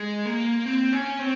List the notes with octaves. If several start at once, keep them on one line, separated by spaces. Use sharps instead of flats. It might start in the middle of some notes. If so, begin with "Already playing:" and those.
Already playing: G#3
A#3
C4
C#4
C4